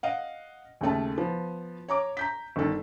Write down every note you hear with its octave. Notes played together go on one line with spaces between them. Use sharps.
D#5 F5 F#5
D#2 C#3 A3 A5
F3 B3
C#5 A#5 D6
A#5 G6 B6
G1 D#3 A4